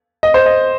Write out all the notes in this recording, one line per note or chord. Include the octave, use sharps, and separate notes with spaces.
D#5
C5
D#5